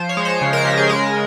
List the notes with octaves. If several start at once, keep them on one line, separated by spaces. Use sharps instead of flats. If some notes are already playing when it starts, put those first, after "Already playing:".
Already playing: F3 C5
C#5
G#3
C5
C#3
A#4
C#3 G4
G#4
G#3 A#4